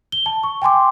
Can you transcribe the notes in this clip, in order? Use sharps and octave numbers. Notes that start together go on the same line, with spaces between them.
G7
A5
C#6
G5 G#5 C6 D6